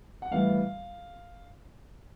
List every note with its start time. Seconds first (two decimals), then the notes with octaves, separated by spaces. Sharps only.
0.22 F#5
0.31 A2 E3 G3 B3 F5